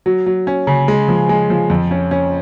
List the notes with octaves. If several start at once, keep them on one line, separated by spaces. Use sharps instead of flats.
F#3
F#3
C#4
C#3
G#3
F3
G#3
F3
F2
C#4
C#4